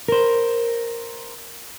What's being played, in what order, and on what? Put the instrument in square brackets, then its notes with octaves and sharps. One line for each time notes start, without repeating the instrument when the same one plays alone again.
[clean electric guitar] A#4 C5